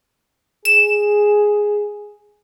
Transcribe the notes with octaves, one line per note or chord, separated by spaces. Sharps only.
G#4 E7